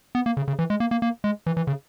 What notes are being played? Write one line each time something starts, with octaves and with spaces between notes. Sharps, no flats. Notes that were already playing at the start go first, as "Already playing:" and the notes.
B3
A#3
C#3
C#3
E3
G#3
A#3
A#3
A#3
G#3
E3
E3
C#3